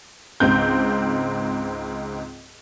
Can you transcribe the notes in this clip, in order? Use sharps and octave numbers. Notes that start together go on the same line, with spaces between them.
C#2 G#2 C4 G6